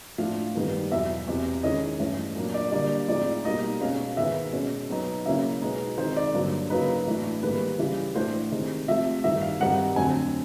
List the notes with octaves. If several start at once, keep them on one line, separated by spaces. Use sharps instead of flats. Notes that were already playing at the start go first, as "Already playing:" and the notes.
A2 F3 A3 D4 F5
G2 D#3 G3 B3
E2 B2 F#3 E5
E2 C3 E3
D#3 G#3 C#4 E4 D#5
G2 E3 A3 C#4
A#2 F#3 A#3 D4
D5
D3 G3 A#3 D5
A2 F3 G#3 C4 D#4 D5
B2 G3 A#3 D#4 D#5
B2 G#3 C#4 F5
G#2 D#3 G#3 B3 E5
B2 G#3 C#4
B2 F#3 B3 D#4
C#3 F#3 A#3 C#4 E4 E5
B2 G#3 B3 D#4
D#3 G#3 C4 D#4 C5
D5
G2 D3 F#3 A#3
C#3 F#3 A#3 D#4 B4
A2 E3 A3 D4
G#2 D#3 G3 A#3 B4
C#3 E3 G3
A2 E3 A3 D4 C5
C3 D#3 G#3
C3 F3 A3 E5
G2 D#3 G3 E5
F5
G2 D#3 G3 C4 D#4 F#5
F2 D3 F#3 A3 C4 G#5